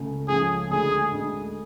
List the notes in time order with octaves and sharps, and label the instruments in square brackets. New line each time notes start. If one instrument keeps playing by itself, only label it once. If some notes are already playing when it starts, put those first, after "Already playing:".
Already playing: [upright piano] C#2 C#3 A3
[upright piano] C#2 C#3 F3 A3 C#4 [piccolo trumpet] G#4
[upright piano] D2 D3 G#3 [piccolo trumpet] G#4
[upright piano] D2 D3 G#3